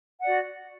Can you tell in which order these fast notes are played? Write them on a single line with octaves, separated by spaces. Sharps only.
F#5 D5 F#4